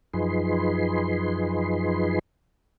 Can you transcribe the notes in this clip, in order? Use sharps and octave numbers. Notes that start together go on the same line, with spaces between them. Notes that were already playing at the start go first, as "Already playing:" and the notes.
F#2 F3 D#4 G#4 B4 C6